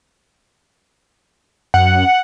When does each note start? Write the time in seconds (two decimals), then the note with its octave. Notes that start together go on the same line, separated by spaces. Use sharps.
1.74 F#2 F#5